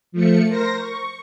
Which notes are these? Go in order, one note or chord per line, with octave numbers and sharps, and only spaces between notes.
F3 A3 C#7
A#4 C5 A#6
C#6